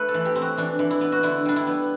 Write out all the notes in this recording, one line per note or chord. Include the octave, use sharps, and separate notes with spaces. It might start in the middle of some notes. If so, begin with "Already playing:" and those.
Already playing: A3 B4
A4
E3
G4
C4
F#4
E3 D4
E3
E4
B3
F#4
D3 E4
G3 D4
E4
B3